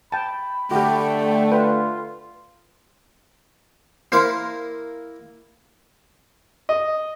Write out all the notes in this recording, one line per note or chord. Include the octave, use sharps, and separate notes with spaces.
G5 A5 B5
D3 A3 F#4 G4 G5
F4 B4
A#3 E4 C5 F5
D#5